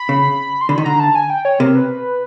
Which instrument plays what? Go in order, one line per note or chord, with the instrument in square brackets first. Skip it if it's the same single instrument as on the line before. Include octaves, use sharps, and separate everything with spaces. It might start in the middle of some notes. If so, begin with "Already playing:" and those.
Already playing: [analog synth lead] B5
[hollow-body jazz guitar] C#3
[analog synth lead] C6
[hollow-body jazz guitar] D3 [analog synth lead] B5
[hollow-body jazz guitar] D#3
[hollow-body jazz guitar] D3 [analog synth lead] A#5
[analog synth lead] A5
G#5
G5
C#5
[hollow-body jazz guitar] C3 [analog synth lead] A#4
[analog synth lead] B4